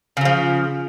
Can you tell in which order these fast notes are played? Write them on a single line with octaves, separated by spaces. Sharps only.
C#3 F#3 F3